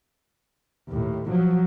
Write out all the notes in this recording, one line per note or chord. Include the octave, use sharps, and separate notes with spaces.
D#2 A2
F3 F#3